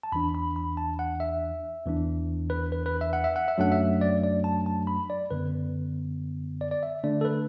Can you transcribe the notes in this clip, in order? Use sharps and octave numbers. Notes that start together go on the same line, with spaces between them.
A5
E2 E3 D4 B5
B5
B5
A5
F#5
E5
E2 E3 D4
B4
B4
B4
E5
F#5
E5
F#5
E5
F#2 F#3 A3 D4 F#5
E5
D5
D5
A5
A5
B5
D5
F#2 D3 B3 B4
D5
D5
E5
D3 A3 D4 D5
A4
B4